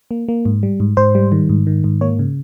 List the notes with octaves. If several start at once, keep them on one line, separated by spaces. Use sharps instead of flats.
A#3
A#3
G#2
G3
G#2
G#2 C5
G3
D#3
G#2
D#3
G#2
A#3 C#5
C#3